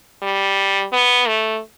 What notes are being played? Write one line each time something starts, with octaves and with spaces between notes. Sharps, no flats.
G3
B3
A3